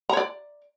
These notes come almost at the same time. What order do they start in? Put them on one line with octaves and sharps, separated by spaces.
A#5 C#5 D5